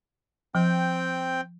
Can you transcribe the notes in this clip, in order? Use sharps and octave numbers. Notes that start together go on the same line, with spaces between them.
F3 C4 G5